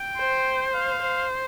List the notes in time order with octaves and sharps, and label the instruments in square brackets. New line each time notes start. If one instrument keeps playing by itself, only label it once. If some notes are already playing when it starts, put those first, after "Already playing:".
Already playing: [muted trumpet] G5
[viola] C5
[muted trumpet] F5
[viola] C5